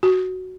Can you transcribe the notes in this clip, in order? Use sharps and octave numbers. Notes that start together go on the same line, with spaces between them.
F#4